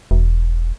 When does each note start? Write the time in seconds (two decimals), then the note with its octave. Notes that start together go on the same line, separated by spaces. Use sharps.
0.11 E1